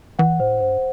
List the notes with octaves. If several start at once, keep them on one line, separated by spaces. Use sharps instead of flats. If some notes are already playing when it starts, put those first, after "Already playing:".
E3 F#5
A2 C5
G2 C5